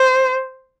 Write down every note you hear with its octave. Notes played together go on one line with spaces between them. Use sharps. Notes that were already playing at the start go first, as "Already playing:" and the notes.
Already playing: C5